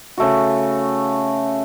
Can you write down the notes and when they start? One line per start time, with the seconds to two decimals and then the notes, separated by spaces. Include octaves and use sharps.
0.18 C#3 A3 F#4